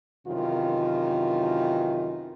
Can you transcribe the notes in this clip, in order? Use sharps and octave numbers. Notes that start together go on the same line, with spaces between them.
F#2 C3 D#3 E3 F4